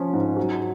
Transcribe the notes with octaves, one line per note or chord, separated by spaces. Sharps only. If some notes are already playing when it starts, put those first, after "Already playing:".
Already playing: F3 C#4
G#2
F#3